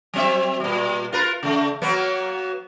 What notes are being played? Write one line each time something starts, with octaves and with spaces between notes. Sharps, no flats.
F#3 C4 E5
A#2 G3
F4 A#4 B4
C#3 A3
F#3 A#3 B3